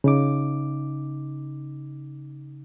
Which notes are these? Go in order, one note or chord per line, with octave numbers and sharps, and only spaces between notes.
C#3 D#4 D6